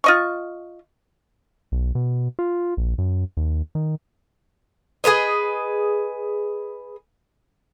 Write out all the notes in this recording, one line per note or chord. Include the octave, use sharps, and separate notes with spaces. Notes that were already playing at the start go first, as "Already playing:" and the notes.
F4 D#5 C#6
B1
B2
F4
A#1
F#2
D#2
D#3
G#4 A4 B4 D#5